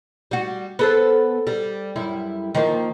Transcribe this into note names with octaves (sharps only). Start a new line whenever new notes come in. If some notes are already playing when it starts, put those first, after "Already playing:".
G3 F#4
B3 A4 C5
G3
F#2 G3 E4
D#3 F3 A#3